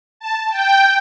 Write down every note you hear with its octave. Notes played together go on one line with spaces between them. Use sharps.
A5
G5